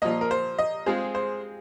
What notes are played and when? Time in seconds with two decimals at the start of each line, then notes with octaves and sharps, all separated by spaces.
0.02 A#2 F3 A#3 D#5
0.21 A#4
0.31 C5
0.58 D#5
0.86 G#3 C4 F4 G#4 C5
1.15 C5